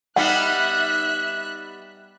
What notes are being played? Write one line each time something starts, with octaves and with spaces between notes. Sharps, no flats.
G3 B3 D#4 E5 F#5 F#6